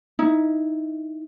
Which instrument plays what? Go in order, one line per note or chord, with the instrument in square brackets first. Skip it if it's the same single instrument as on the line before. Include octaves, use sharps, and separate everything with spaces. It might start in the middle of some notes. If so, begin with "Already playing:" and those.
[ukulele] D#4 E4